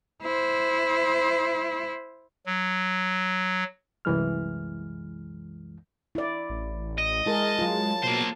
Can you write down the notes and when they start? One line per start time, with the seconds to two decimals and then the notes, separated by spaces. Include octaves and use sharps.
0.23 E4 C5
2.46 F#3
4.05 C2 F#2 E3 G#3 F6
6.15 E4 D5
6.50 A1
6.98 D#5
7.26 G#3 E4 G#4 A#4 A5
7.59 F#3 F4
8.03 B2 A#3 C5